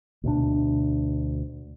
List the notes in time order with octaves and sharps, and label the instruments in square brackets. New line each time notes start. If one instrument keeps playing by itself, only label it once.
[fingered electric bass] D2 B2 D4